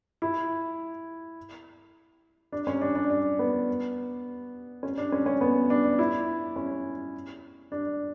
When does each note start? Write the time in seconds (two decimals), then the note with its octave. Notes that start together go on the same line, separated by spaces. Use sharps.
0.22 E4
2.52 D4
2.67 C#4
2.81 D4
2.95 D4
3.10 D4
3.39 B3
4.83 C#4
4.98 D4
5.12 C#4
5.26 C#4
5.41 B3
5.70 D4
5.99 E4
6.56 C#4
7.72 D4